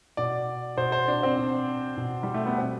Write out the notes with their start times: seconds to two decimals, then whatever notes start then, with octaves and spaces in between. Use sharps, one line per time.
0.17 B2 D5
0.77 B2 C5
0.92 C5
1.08 D4
1.23 C4
1.38 B2
1.97 B2
2.23 G3
2.34 A3
2.46 B3
2.58 B2 C4